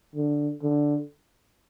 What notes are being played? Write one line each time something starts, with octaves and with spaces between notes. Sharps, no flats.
D3
D3